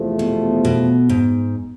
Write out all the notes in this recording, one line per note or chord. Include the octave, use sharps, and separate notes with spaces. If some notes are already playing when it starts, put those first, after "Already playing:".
Already playing: E2 C3 F3 A3
B2
B2
G#2